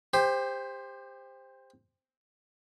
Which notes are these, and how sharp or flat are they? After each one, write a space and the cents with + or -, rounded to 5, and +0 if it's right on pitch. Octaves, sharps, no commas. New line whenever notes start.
G4 +25 C5 +0